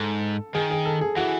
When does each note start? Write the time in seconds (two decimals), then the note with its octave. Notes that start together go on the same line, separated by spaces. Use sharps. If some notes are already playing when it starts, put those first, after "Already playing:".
Already playing: G#2 A4
0.54 D#3 G#4
0.71 G#4
0.85 A4
1.01 G#4
1.16 E3 F#4